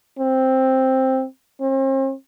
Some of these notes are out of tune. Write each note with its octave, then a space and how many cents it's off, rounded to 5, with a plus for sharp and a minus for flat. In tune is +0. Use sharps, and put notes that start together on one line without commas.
C4 +5
C4 +45